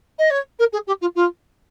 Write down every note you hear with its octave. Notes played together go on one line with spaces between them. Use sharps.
D#5
C#5
A#4
G#4
G4
F4
F4